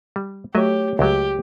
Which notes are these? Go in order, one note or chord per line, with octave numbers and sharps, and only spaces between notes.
G3
F#3 A3 G4 C#5 D#5 E5
C#2 F#3 G4